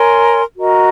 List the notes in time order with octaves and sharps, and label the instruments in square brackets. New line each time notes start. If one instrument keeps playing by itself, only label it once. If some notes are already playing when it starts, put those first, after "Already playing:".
Already playing: [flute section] A#4 C#5 G#5 C6
F#4 A#4 D#5 A#5